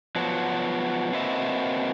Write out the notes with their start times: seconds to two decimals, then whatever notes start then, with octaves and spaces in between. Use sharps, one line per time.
0.16 F3 F#3 B3 F#4
1.13 A#3 C4 F#4 B4 D#5 E5